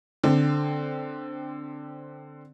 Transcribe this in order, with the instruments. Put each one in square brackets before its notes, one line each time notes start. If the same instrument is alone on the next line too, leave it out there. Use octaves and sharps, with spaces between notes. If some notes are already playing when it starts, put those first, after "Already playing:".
[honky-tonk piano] D3 C4